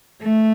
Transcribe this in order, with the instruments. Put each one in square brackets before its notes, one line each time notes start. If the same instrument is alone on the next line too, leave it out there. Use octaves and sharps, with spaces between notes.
[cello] A3